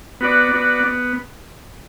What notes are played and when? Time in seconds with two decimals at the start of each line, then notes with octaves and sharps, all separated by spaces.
0.21 B3 F#4 B4 D5
0.52 B3 F#4 B4 D5
0.84 B3